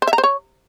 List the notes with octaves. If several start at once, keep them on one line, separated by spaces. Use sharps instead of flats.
C5
E5
A#5
C5
C#5